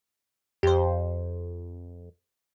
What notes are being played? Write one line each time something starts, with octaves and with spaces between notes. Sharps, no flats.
F2 G4 C5